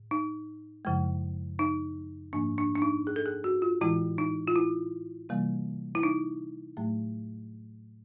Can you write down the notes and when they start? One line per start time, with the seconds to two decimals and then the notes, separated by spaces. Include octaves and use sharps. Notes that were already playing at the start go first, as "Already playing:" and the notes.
Already playing: A2
0.11 D#4
0.85 F#2 C#3 F3 G#3
1.59 D#4
2.33 G#2 F3 A#3 D4
2.58 D4
2.75 D4
2.82 D#4
3.07 G#4
3.16 A4
3.26 G#4
3.44 F#4
3.62 F4
3.81 A2 E3 G#3 E4
4.18 D#4
4.47 F4
4.56 E4
5.29 C3 E3 G3 A#3
5.95 E4
6.03 D#4
6.77 A2 F#3 A3